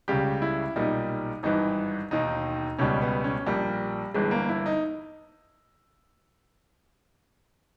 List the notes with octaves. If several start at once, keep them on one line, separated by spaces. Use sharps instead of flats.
C#2 C#3 G3 G4
E4
B1 A#2 G3 D#4
G#1 G2 E3 D#4
E1 D#2 D#3 D#4
C#2 B2 G3 C#4
B3
C#4
A#1 A#2 G3
G1 G2 E3 G#3
A#3
E4
D#4